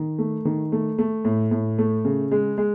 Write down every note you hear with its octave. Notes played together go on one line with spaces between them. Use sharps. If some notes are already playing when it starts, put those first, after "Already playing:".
Already playing: D#3
A3
D#3
A3
A3
A2
A2
A3
C#3
G#3
G#3